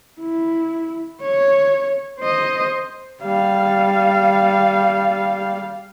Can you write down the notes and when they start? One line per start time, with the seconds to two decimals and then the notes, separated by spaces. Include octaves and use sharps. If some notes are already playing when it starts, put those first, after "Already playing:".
0.20 E4
1.21 C#5
2.20 C5 D#5
3.23 G3 F5